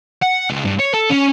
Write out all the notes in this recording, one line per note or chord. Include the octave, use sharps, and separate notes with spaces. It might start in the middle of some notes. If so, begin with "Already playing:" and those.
F#5
C#2
G2
C#5
A4
C#4